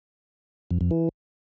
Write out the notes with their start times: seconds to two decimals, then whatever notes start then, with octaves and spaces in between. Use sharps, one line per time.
0.71 F2
0.81 F2
0.91 E3